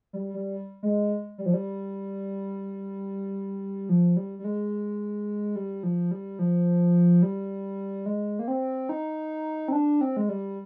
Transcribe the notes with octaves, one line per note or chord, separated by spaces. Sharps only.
G3
G3
G#3
G3
F3
G3
F3
G3
G3
G#3
G3
F3
G3
F3
G3
G#3
A#3
C4
D#4
C4
D4
C4
G#3
G3